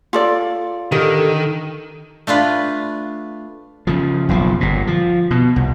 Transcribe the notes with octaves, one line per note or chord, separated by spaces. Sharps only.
F4 A4 D5
D3 D#3 G4 A#4
A3 D4 F4 B4
C#3 F3
F#1 B1 A2 F3
G1 A#2
F3
B2
C2